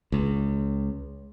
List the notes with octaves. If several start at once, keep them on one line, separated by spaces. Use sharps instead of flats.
C#2